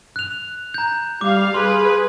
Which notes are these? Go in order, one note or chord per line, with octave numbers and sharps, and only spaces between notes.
F#6 F7
A#5 G6
G3 F5 D6
G#4 B4 C6